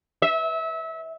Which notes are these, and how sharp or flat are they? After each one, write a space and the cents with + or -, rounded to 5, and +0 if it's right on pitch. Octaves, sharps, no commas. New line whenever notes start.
E5 -25